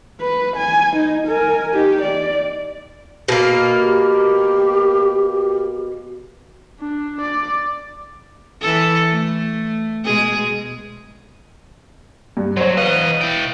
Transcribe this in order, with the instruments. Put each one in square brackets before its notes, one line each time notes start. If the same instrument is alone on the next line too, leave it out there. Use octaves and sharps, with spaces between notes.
[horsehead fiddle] B4
G#5
D#4
A#4 G#5
D#4 G4
D5
[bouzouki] B2 A#3
[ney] G4
[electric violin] D4
D5
[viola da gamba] E3 A4
A3
B2 G#3 G#4
[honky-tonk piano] G2
[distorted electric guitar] F#3 [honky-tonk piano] C5 C#5
[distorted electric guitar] E2 D#5 [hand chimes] B4 F5 [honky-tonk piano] F#6
[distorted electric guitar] E4 G5